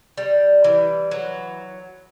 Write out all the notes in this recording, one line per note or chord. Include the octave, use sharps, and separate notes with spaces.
G3
E3
F#3